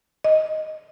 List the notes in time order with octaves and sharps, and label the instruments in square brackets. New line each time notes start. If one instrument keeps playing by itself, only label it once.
[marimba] D#5